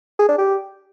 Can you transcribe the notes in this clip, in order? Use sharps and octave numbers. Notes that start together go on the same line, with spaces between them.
G#4
D4
G4